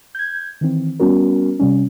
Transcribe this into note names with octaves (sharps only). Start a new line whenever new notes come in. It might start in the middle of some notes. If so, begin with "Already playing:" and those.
G6 G#6
D#3 E3 C4
G3 B3 C#4 F#4 A#4
C3 G3 C#4